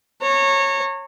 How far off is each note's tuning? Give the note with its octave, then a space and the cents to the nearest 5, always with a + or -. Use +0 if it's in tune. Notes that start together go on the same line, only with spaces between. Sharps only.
C#5 -15 A#5 -35